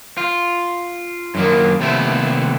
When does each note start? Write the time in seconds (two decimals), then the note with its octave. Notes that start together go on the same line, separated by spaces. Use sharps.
0.17 F4
1.35 F#2 D#3 A#3
1.80 D#2 C3 A3 B3 E4